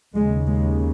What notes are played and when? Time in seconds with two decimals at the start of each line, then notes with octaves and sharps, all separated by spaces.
0.15 D#2 C#3 G#3
0.47 G#3